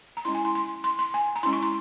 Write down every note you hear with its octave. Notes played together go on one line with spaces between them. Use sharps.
A#5
G#3 C#4 E4 C6
G#5
C6
C6
C6
C6
G#5
A#5
G#3 C#4 E4 C6
C#6
C6